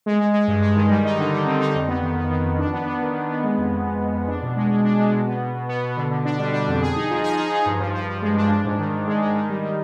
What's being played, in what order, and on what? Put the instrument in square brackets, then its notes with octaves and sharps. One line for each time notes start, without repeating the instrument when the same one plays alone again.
[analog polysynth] G#3
G#3
G#3
G2
G#3
D#3
G3
D#4
D3
G3
C4
D#4
F2
B3
D#3
B3
D#3
F2
D4
B3
B3
D#3
D#3
B3
G#3
F2
F2
F2
F2
F2
D4
B2
G#3
G#3
D4
G#3
B2
B3
B2
B2
B3
B2
D3
D3
D4
G3
D4
F2
G#4
D#4
F3
G#4
D#4
D#4
G2
F3
F3
F3
G#3
D4
D4
G#2
D#3
G#2
G#3
G#3
D#3
G3
D#3